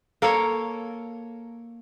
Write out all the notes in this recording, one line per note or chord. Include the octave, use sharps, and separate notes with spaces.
A#3 A4 A#4 C#5